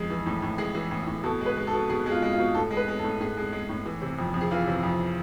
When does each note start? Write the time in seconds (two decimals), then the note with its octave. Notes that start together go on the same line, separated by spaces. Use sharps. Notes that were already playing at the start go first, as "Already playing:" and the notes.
Already playing: F2 G#3
0.10 E3
0.26 A2
0.42 A2
0.58 G#3 G#4
0.75 E3
0.91 A2
1.07 A2
1.24 B2 A4
1.41 G#3
1.46 B4
1.57 G#3
1.67 A4
1.73 B2
1.90 B2 G#4
2.06 G#3 G#4
2.12 F4
2.22 G#3
2.33 F4
2.39 B2
2.55 A2 A4
2.71 G#3
2.77 B4
2.88 G#3
2.99 A4
3.04 A2
3.20 A2 G#4
3.37 G#3
3.53 G#3
3.69 A2
3.86 E3
4.02 C3
4.19 F2
4.34 F2
4.41 G#4
4.51 E3 F4
4.68 C3
4.83 F2